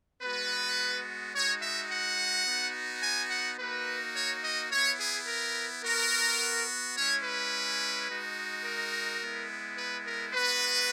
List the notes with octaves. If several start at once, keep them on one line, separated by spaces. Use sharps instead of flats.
G#3 B3 F#4 B4
G#3 D#4 F#4 C#5
E5
F#5
B3 D#4 F#4
G#5
F#5
A#3 D#4 F#4 B4
C#5
D#5
B3 E4 C#5
G#4
A#4
B3 F#4 A#4
G#3 C#4 E4 C#5
B4
G#3 D#4 F#4
A#4
G#3 B3 E4
B4
A#4
G#3 B3 F#4 B4